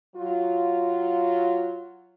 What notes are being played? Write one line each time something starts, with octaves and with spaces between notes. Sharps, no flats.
F#3 F4